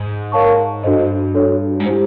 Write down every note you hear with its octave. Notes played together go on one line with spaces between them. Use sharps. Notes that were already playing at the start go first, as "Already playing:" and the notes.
Already playing: G#2
A#4 C#5 F5 A5 C#6
G2 D4 F#4 A4 C5 D#5
D4 F#4 A4 C#5
G#2
E4 G4 C5